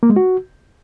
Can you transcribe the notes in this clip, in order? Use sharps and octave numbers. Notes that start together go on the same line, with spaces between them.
A#3
G#3
F#4